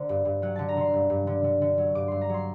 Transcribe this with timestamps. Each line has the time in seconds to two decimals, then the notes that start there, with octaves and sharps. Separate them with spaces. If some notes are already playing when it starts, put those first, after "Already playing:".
Already playing: D3 A#4 C5
0.09 G2
0.25 G2
0.42 F#3 F#5
0.56 D3 A5
0.69 A#5
0.77 D3 C6
0.94 G2
1.10 G2
1.27 D3
1.44 D3
1.62 D3
1.78 F#3
1.95 G2 D6
2.08 G2 C6
2.21 A#5
2.30 F#3 C6